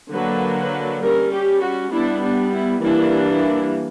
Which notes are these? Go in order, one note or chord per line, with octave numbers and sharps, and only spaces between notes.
D3 F#3 A#3 D4 B4
B4
G3 C#4 A#4
G4
F#4
G3 B3 D4 E4
D4
E4
E3 G3 A#3 D4 E4
E4